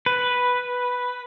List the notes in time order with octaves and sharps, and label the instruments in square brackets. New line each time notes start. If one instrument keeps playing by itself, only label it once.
[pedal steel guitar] B4